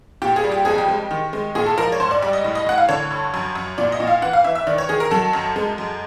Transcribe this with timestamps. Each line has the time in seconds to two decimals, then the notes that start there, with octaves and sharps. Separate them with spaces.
0.22 A#2 G4
0.36 G#4
0.44 G3
0.52 G4
0.65 F2 G#4
0.78 G4
0.88 G#3
1.11 D#3
1.33 G#3
1.55 A#2 G#4
1.66 A4
1.78 F3 A#4
1.92 C#5
2.00 G#2 C5
2.11 D5
2.22 G3 D5
2.33 D#5
2.44 A2
2.55 D#5
2.67 A2 F#5
2.78 F5
2.89 D3 C#5
3.11 G2
3.34 F#2
3.56 F#2
3.78 A#2 D5
3.92 D#5
4.00 A#2
4.07 F5
4.22 E3 F#5
4.33 F5
4.44 E3 E5
4.55 E5
4.67 D#3 D5
4.78 C#5
4.89 D#3 G#4
5.00 A#4
5.11 F#3 A4
5.33 F#2
5.56 G#3
5.78 F#2